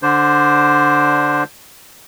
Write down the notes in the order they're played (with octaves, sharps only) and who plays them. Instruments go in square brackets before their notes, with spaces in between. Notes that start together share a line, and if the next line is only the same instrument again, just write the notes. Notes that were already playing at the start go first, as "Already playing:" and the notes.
[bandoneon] D3 D4 C5